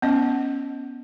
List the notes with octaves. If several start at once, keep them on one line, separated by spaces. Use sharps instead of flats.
B3 C#4 D#5